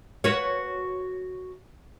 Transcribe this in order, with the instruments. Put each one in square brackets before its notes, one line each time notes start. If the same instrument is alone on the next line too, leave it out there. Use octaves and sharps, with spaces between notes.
[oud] F#4 B4 C#5